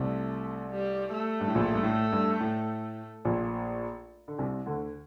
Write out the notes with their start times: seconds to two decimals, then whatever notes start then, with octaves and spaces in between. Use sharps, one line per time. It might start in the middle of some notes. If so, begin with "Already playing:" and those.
Already playing: C2 C3 A3
0.70 G3
1.13 A3
1.40 G2
1.48 A2
1.55 A#1 A#2
1.75 G2
1.83 A2
2.12 G2
2.40 A2
3.25 A#1 A#2
4.28 D3
4.38 C2 C3
4.66 D2 D3